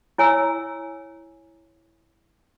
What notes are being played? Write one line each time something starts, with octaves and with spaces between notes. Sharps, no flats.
E4 C#5 G#5 A#5 E6